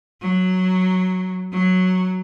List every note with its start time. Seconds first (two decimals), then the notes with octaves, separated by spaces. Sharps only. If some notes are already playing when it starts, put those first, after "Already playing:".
0.21 F#3
1.51 F#3